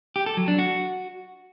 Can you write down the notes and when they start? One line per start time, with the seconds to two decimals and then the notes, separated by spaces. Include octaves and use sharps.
0.16 G4
0.26 A4
0.37 F#3
0.48 D4
0.59 F#4